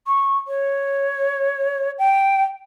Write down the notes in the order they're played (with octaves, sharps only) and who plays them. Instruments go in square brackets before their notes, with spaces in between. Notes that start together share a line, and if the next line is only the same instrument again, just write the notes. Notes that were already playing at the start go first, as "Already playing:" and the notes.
[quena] C#6
C#5
G5